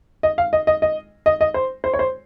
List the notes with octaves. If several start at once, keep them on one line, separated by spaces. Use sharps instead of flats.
D#5
F5
D#5
D#5
D#5
D#5
D#5
C5
C5
C#5
C5